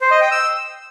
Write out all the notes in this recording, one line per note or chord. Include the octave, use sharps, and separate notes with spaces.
C5
D#5
G5
E6